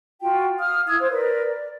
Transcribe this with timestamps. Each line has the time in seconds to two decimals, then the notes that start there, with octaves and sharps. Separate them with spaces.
0.21 F4 F#4 G5
0.58 F5 D#6 F6
0.87 E4 D#6 E6 G#6
0.99 C5
1.11 A#4 B4 D5
1.42 D5